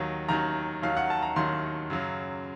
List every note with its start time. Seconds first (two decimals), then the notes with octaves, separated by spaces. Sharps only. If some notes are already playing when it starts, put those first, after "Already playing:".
Already playing: D#2 D#3 F#3 A#5
0.28 D#2 D#3 F#3 A#5
0.82 D#2 D#3 F#3 F5
0.97 F#5
1.10 A5
1.22 A#5
1.36 D#2 D#3 F#3 C6
1.90 F#2 C#3 F#3